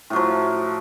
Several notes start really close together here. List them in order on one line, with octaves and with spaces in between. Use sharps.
A2 F#3 F3